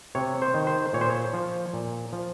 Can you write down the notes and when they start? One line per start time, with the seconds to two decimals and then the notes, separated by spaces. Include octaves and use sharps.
0.15 C3 C#5
0.42 C5
0.54 D#3
0.67 C5
0.93 A#2 C#5
1.01 C5
1.10 C#5
1.34 F3
1.74 A#2
2.13 F3